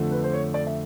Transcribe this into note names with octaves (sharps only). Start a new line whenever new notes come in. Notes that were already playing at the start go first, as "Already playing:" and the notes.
Already playing: F2 D3 F3 A3
B4
C5
C#5
D5
E5